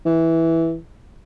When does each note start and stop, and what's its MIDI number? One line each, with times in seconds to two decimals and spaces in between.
0.05 0.76 52